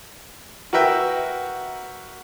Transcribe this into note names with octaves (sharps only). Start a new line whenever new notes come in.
F#4 A#4 B4 E5 G5